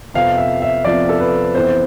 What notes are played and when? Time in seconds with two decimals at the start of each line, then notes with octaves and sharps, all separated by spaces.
0.14 F2 C3 F3 B3 F5
0.38 E5
0.62 E5
0.85 F2 C3 F3 B3 D5
1.09 A4
1.20 B4
1.54 F2 E3 B3 C5